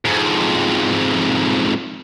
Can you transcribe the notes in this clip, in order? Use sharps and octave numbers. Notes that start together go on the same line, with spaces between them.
F2 G#2